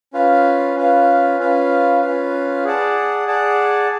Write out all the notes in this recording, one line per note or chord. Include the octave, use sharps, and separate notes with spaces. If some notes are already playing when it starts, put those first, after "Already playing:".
C#4 F4 B4 F5
C#4 F4 B4 F5
C#4 F4 B4 F5
C#4 F4 B4 F5
G#4 D5 F#5 A5
G#4 D5 F#5 A5